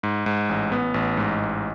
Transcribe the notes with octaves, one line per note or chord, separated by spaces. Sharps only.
G#2
G#2
A1
B3
A1
G#2
A1